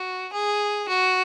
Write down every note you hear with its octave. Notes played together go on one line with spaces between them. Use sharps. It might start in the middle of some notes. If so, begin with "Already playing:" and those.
Already playing: F#4
G#4
F#4